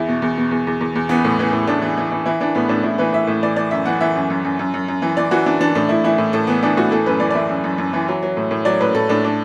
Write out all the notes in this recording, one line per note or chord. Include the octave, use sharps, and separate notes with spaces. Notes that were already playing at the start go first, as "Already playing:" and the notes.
Already playing: E2 E4
B2
E2
B2
E2
E2
E2
E2
E3 B3
A2
E3
A2
A2 D4
E3
E3
E3
E3 E4
E3 D4
A2 B3
A2 D4
A2 E4
E3 B4
A2 E5
A2 E5
E3 D5
E3 D5
F#2 E5
E3 F#5
E3 E5
F#2
F#2
F#2
F#2
F#2
F#2
E3
E3 D5
E3 F#4
E3 D4
E3 D4
A2 D4
A2 E4
E3 E4
A2
A2 A4
E3 B3
E3 D4
A2 F#4
E3 A4
F#2 B4
E3 D5
D5
E3 E5
F#2
F#2
F#2
E3
F#3
F#3
A2
A2
F#3 D5
A2 B4
A2 A4
A2 D4
D4